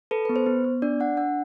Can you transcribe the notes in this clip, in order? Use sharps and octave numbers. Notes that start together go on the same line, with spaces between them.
A4 B4
B3 B4
C5
B3
B3
D4 D5
D4 F#5
D4 F#5